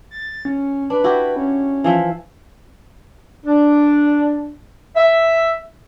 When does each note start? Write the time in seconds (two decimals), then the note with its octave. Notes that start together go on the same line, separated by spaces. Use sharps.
0.11 A6
0.45 C#4
0.90 D4 B4
1.04 E4 F#4 G4
1.36 C#4
1.84 E3 F3 E5
3.45 D4
4.95 E5